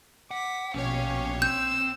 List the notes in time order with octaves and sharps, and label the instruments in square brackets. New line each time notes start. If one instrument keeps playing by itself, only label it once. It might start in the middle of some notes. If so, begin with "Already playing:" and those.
[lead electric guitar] F#5 [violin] D6 B6
[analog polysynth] A#1 B2 C#5 [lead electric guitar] C#4 [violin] G4 F5
[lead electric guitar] C4 [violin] E6 [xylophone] G6